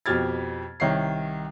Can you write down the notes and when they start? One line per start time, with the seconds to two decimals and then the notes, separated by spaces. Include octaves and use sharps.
0.06 F2 B2 G4 F6 G#6 A6
0.80 C2 D#3 C#5 C7